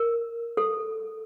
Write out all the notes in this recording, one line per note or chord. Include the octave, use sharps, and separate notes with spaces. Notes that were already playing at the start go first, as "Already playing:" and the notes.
Already playing: A#4
A4